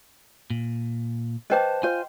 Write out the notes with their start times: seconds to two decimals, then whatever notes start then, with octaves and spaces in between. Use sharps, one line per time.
0.50 A#2
1.50 B4 C5 D#5 G5 A5 D6
1.83 F4 C5 G#5